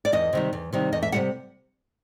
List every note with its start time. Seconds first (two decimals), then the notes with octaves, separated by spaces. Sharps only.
0.05 D5
0.12 E2 D#5
0.33 C3 D#3 G3
0.53 E2
0.73 C3 D#3 G3
0.92 E2 D#5
1.03 E5
1.12 C3 D#3 G3 F#5